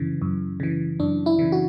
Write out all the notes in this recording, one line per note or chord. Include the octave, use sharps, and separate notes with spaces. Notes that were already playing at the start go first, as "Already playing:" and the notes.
Already playing: F#2 C#3 E3
F#2
C#3 E3
F#2 D4
E4
C#3 E3
F#4